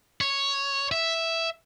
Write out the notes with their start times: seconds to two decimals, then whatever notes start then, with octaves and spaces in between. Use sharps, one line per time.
0.21 C#5
0.92 E5